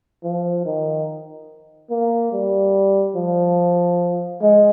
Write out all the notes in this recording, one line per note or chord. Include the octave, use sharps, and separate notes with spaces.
F3
D#3
A#3
G3
F3
G#3